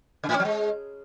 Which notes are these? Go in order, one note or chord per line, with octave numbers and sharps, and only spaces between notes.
C#3
A2
C#4
F#3
G#3